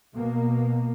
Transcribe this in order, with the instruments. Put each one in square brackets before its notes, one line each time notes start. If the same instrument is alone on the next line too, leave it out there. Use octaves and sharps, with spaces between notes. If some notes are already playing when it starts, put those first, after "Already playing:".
[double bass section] B2 A#3